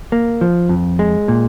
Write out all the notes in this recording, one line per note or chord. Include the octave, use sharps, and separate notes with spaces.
A#3
F3
F2
G#3
A#2